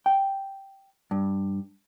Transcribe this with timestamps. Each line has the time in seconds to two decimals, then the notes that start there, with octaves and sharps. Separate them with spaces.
0.06 G5
1.11 G2